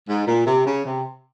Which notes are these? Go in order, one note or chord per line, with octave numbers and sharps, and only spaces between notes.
G#2
A#2
C3
C#3
C3